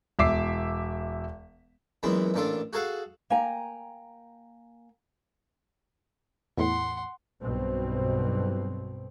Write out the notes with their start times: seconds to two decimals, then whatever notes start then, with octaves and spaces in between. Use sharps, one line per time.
0.19 E1 E5 D6 C7
2.03 F#2 A#2 E3 G#3 B3
2.34 A1 A#2 D4 F4 A4
2.73 F#4 G#4 A4 F5 F#5
3.30 A#3 G5 G#5 A#5
6.57 E2 A2 F#5 C6
7.42 B1 G2 B2 C4